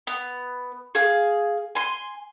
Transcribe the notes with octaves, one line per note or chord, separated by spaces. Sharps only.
B3
G#4 F5
G#5 C6